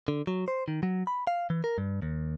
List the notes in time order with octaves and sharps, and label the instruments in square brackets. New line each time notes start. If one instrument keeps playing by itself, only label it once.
[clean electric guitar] D3
F#3
C5
D#3
F#3
B5
F5
E3
A#4
G2
D#2